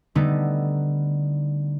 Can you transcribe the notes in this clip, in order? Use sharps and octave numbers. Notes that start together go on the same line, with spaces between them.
D3 G3 A3 B3 D#4